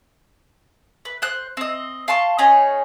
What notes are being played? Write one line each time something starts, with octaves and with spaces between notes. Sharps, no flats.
B4
C5 F#6
C4 D#5
F5 A5 C6 C#6
C#4 D#4 G#4 C#5